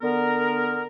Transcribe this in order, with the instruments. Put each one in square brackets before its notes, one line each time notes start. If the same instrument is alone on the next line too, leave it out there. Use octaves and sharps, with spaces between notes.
[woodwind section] D3 B3 A#4